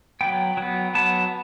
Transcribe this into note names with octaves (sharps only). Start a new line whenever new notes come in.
F#3 B3 G5
F#3 B3
F#3 B3 A5